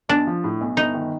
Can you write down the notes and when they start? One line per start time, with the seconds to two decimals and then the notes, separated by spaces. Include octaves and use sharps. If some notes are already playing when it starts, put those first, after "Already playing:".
0.09 B1 D4
0.27 F3
0.44 A2
0.61 B1
0.77 G1 D#4
0.94 D#3